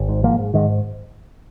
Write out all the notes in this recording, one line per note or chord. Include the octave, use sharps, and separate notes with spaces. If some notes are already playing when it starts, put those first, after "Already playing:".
Already playing: G#1
G#2
G#2 F3 A#3
G#2
G#2 D#3 G#3